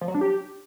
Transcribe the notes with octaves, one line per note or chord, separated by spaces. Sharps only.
F3
F#3
D4
G4